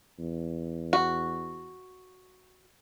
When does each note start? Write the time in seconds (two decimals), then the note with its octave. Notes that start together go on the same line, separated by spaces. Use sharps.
0.18 E2
0.93 F#4